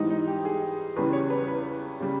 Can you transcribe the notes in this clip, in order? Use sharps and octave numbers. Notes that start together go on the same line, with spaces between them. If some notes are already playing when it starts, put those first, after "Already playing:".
Already playing: G#2 E3 G3 D#4
D#4
G4
G#4
E2 C#3 G3 B4
C#5
B4
B4
C#3 G3